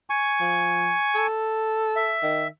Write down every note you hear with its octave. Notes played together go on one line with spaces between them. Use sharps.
G#5 C#6
F3
A4
E5
D#3